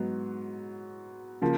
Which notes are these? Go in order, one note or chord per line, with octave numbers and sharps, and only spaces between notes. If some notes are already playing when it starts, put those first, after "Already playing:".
Already playing: G#2 F#3 B3
C#3 F3 A#3